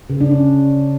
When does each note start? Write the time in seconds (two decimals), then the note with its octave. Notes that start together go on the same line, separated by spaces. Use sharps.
0.10 C#3
0.21 D4
0.31 C#4